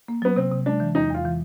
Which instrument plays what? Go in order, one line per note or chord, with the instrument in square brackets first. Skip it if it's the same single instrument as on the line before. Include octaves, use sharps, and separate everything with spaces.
[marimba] A#3
[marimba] F#3 [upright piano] B3
[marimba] C3 [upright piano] C4
[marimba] C3
[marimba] G#3 [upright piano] D4
[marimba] E3
[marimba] E2 [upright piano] D#4
[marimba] E2 [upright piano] F4
[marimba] E3